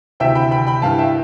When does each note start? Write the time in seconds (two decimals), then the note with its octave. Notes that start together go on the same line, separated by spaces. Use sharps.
0.20 D2 C3 E3 E5 G5
0.35 G5 B5
0.51 G5 B5
0.67 G5 B5
0.82 G2 E3 F5 A5
0.99 E5 G5